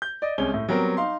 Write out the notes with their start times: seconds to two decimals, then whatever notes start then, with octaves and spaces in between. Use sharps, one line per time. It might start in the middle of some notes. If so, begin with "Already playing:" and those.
0.02 G6
0.22 D5 D#5
0.38 C2 G#3 C#4 G7
0.54 A2
0.69 F#3 G3 B3 C4 A#4 C5
0.97 D#4 F5 C6